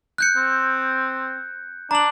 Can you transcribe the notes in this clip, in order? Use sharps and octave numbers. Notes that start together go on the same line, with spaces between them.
F#6 G6 C#7
C4
D4 A#5 F#7